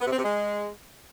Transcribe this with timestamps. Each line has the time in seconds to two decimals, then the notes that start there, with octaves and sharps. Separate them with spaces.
0.01 B3
0.06 C3
0.12 C4
0.18 C3
0.24 G#3